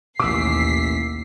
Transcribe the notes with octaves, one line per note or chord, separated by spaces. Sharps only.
A1 D#2 B2 D6 E6 B6 C7